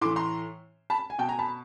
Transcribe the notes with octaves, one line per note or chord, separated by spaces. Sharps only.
A2 E3 C6 D6
A#5 C6
A5 B5
G#5
B2 G5 A5
G#5 A#5
A5 B5